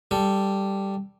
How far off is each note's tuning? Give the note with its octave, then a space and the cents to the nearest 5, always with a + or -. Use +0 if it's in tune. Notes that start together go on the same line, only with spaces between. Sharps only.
G3 +0 A4 +0